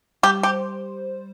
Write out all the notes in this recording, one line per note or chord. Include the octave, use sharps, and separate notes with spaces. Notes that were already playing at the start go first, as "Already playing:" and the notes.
G3 G4
G4 C5